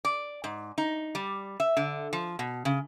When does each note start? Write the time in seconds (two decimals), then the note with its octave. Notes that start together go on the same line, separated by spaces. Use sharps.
0.05 D5
0.44 G#2
0.78 D#4
1.15 G3
1.60 E5
1.77 D3
2.13 F3
2.39 B2
2.65 C#3